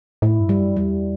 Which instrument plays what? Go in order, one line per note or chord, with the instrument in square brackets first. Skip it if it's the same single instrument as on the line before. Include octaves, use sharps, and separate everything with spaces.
[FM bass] A2 [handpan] E4
[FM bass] G2
[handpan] G3
[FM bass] F#2
[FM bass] E2 [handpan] G3